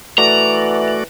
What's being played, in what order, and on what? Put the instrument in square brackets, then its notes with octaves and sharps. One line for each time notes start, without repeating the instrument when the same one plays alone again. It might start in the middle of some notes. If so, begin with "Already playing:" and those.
[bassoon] E3 [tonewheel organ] A3 F#4 D5 [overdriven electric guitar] A#5